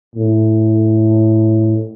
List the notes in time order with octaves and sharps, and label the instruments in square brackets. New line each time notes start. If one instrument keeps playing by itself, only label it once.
[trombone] A2